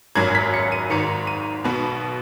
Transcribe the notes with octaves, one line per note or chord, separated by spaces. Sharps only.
G#1 F#2 F#3 G#6
B6
C#7
D#7
G#1 G#2 D#3 C#7
D#7
B1 B2 B3